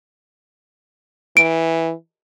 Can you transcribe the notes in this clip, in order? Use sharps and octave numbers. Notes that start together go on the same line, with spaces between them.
E3 D7